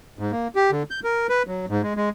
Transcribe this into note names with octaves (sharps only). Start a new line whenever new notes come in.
G#2
A#3
G4
D3
G6
A#4
B4
F#3
G#2
G#3
G#3